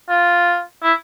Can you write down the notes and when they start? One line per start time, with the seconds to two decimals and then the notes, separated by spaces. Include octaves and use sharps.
0.09 F4
0.83 E4